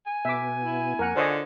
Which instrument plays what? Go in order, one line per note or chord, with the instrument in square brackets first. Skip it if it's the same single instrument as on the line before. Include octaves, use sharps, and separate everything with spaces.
[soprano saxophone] G#5
[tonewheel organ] B2 B3 [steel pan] E5 D6
[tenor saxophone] E4
[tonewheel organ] F2 A#3 [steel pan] A#4 F#5
[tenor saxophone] D3 [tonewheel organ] F4 [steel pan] C5 C#5 D#5